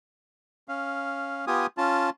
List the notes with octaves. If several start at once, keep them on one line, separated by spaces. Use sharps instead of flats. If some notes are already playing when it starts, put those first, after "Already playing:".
C#4 F5
B3 F4 G4 G#5 D#6
C#4 F4 A5